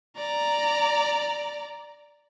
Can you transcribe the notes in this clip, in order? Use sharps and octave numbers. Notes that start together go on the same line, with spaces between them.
D5 A#5